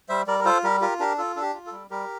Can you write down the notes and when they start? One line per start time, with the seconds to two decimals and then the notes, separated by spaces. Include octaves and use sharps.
0.09 G3 C5 E5
0.27 G3 A#4 D5
0.39 A#4
0.45 F4 A4 C5
0.64 G3 G4 A#4
0.81 F4 G4 A#4
1.00 D4 G4 A#4
1.18 F4 A4
1.36 D4 A4
1.42 G4
1.54 F4
1.66 A4
1.72 G3
1.90 G3 G4 A#4